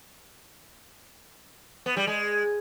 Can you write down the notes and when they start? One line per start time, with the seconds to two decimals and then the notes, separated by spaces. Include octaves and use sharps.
1.86 B3
1.97 G3
2.07 G#3